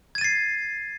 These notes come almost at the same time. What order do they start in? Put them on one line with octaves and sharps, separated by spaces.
G#6 D#7 A6 C7